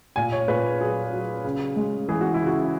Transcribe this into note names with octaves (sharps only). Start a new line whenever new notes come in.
A#2 G#5
C#5
A#2 B4
F#3 G#4
F#3
C#3
G#3
E3 G#4
F#4
E4
C#3
F#4